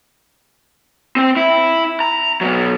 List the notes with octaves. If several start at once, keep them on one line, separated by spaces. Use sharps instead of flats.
C4 G5
E4
A#5
B2 F#3